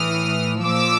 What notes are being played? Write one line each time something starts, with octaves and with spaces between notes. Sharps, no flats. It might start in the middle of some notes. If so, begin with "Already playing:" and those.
Already playing: A2 E3 D#6 F6
A#2 F3 D6 E6